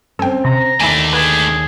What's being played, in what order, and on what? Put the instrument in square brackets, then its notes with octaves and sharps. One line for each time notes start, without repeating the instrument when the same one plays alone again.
[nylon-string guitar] C4 C#4 [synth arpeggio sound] A4 G5
[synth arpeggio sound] C3 [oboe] A#5
[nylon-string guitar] D#2 [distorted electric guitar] A3 D4 [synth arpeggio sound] E4 G#5
[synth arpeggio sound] B3 [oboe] G#4